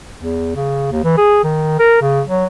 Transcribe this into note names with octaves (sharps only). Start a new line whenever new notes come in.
E2
C#3
D#2
E3
G#4
D#3
A#4
C#3
F#3